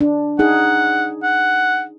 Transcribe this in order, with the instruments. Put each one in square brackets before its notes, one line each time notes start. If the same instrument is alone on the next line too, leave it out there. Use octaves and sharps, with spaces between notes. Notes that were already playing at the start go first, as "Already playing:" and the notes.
[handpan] D4
[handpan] D#4 G#4 [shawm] F#5
[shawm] F#5